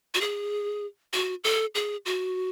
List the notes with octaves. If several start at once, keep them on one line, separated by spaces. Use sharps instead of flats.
F#4
G#4
F#4
A4
G#4
F#4